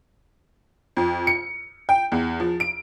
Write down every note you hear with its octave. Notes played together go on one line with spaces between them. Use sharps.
F2
C#7
G5
E2
F3
D7